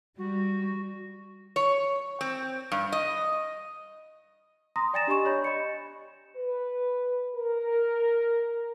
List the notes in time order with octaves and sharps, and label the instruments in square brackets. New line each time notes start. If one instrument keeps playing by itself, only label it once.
[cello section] G3 [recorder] F#4
[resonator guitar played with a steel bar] C#5
C4
G2
D#5
[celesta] A#5 C6 D#6 A#6
D5 G5 G#5 A6 A#6 E7
D4 G4 D#5 G#5 C#6 E7
C#5 B5 G6
D#5 B5 C#7
[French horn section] B4
A#4